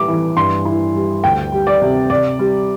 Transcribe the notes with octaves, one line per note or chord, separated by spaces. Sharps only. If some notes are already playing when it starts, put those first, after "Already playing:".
Already playing: A2 G3 D6
E3
G2 C6
E4
G3
D2 G5
G3
D5
C3
C3 D5
G3